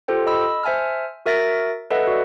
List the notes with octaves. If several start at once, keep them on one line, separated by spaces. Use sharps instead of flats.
F4 G4 A4 C5 G5
D#5 B5 E6
C5 E5 G#5 A5 F6
F#4 A#4 E5 A6 A#6 D7
A4 B4 D#5 E5 F#5
F#4 D5